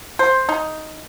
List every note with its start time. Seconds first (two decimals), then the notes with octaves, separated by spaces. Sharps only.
0.19 C5
0.49 D#4